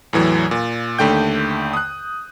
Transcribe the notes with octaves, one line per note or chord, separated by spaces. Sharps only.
E2 A2 E3 F#3
A#2
D#2 D3 A3 G5 G6
D#6 F#6